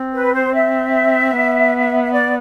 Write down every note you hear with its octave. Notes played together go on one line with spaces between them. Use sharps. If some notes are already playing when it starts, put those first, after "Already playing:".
Already playing: C4
B4
C5
E5
B3
E5
D5